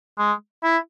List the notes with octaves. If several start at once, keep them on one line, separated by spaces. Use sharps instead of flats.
G#3
E4